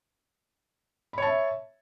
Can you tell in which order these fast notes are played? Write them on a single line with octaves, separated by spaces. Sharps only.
B5 C#5 A5 E5